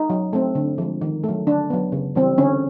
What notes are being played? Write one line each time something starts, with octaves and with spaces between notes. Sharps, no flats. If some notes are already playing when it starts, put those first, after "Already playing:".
Already playing: D#4
F#3
A3 C4
D3
F3 G#3
D#3
F#3 A3
D3 D4
F#3 B3
C#3
E3 G3 C4
D3 C#4